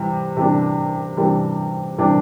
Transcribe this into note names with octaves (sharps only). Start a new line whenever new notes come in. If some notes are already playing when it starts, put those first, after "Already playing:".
Already playing: C3 E3 G3
C3 E3 G3 D4
C3 E3 G3 D4
C3 E3 G3 D4